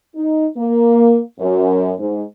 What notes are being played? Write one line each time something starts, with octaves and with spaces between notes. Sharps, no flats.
D#4
A#3
F#2
G#2